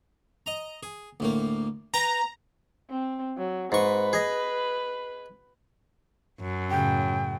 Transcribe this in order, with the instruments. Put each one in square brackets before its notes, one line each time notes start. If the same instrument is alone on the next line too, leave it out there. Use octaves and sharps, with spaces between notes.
[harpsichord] D#5 A#5
G#4
D2 A2 A#3
[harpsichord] B4 G5 [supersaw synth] A#5
[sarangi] C4
F#3
[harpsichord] G#2 C#6 [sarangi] B4
[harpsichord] G#4 D#5
[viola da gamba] F#2
[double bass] A2 C#3 [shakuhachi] G5